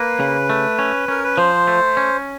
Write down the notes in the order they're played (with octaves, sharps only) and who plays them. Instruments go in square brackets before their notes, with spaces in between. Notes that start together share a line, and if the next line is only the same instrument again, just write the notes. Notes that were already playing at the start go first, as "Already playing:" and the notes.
Already playing: [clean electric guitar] A#3 [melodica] B4
[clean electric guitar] C#3
A3
C#4
[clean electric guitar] C#4 [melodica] A#4
[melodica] B4
[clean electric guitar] F3 [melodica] C5
[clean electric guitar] A3
C#4